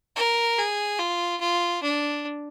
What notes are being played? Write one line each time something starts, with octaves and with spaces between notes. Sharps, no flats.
A#4
G#4
F4
F4
D4